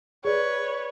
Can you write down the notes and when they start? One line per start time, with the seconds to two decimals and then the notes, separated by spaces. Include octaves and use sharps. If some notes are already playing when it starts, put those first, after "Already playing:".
0.25 G#4 B4 C#5 D5